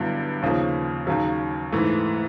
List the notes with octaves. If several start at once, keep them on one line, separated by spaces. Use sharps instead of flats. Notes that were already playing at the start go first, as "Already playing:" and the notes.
Already playing: G2 D3 F#3 B3 E4
D#2 C#3 F3 A#3
D#2 C#3 F#3
G#2 E3 A3